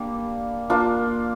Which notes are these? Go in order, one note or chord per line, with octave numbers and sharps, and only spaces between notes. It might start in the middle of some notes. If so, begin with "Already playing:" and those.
Already playing: G3 A#3 D4
A#3 D4 F4